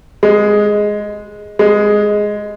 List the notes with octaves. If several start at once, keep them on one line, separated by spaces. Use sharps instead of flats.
G#3
G#3